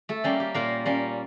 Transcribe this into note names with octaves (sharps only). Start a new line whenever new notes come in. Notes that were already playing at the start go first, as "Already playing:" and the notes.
A3 A4
G3 A#3 C#4 G4
G4
A#2 A#3 A#4
G3 A#3 C#4